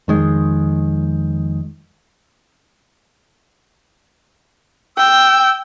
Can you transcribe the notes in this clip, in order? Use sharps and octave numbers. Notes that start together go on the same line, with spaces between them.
F2 D#3 G#3
G5 E6